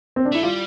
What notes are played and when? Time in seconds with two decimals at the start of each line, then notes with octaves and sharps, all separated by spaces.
0.16 C4
0.25 D4
0.32 A3 E4
0.43 G3 F4